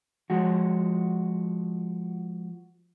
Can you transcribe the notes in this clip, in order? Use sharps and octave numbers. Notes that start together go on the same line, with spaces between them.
F3 G#3 F#4